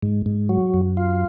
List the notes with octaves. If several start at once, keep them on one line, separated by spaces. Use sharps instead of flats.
G#2
G#2
F#3
F#2
F4